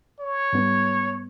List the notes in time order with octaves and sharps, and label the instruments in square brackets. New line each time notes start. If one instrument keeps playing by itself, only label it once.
[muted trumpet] C#5
[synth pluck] G#2 G3 B3